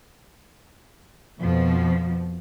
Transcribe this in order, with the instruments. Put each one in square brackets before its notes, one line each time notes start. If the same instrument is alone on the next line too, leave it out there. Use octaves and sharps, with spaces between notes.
[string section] F2 B2 F3